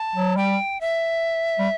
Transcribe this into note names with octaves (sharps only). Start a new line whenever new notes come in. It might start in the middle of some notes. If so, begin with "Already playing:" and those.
Already playing: A5
F#3
G3 G5
E5
G3